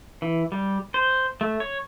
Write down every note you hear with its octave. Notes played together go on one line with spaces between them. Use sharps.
E3
G3
C5
A3
C#5